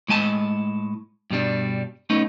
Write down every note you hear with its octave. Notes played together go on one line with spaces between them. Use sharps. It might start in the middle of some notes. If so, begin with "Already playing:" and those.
A2 G#3 G#5 A5
G2 B2 G3 D4
A3 B3 C#4 D#4